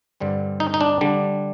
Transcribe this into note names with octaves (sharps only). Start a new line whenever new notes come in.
G2 D3 G3 C4
D#4
D#4
D4
D3 G3 D4